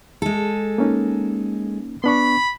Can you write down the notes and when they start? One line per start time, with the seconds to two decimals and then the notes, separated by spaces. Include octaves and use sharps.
0.22 G#3 A4
0.78 A#3 C#4 D#4
2.04 B3 D4 B5 C#6